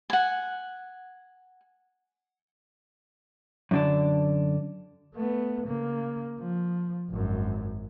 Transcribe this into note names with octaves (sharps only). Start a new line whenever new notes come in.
F#5 G#5
F#2 D3 D4
A3 B3
C#3 A#3
F3
G#1 F#2